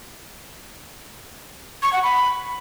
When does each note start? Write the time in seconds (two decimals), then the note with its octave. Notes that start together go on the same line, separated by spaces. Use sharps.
1.83 C#6
1.93 F#5
2.03 B5